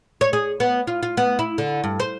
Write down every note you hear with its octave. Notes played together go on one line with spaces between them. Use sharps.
C#5
G#4
B3
F4
F4
B3
E4
D3
G2
C5